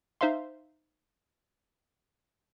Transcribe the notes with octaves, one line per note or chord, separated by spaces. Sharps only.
D#4 C5 E5 F5 C6